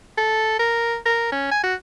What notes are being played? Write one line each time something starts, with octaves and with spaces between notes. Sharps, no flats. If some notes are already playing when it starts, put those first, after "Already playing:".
A4
A#4
A#4
C#4
G#5
F#4